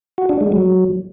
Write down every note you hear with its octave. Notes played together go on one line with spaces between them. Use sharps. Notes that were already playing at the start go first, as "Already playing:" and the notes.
F#4
D4
G#3
F#3